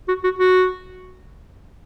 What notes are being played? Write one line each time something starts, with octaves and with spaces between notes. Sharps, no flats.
F#4
F#4
F#4